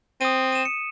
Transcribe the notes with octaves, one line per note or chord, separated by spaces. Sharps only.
C4 D#6 D#7
D#7 E7
C#7